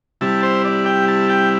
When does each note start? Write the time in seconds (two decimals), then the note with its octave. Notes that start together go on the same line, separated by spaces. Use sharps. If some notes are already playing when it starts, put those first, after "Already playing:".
0.21 C3 G3 E4 A5
0.43 C5
0.65 D5
0.86 G5
1.08 A5
1.30 G5